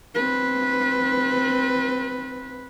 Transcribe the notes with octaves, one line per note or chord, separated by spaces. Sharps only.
C4 B4